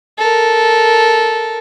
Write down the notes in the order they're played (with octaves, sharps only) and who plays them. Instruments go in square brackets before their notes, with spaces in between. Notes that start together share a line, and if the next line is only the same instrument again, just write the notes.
[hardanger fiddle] A4 A#4